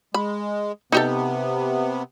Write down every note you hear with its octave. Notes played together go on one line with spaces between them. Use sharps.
G#3 B5
C3 B3 D#4 G4 A4